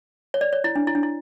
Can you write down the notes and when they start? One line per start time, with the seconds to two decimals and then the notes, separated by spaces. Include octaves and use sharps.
0.34 C#5
0.41 D5
0.53 C#5
0.64 E4
0.75 D4
0.87 E4
0.95 D4
1.03 E4